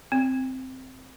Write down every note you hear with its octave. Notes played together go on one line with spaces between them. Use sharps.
C4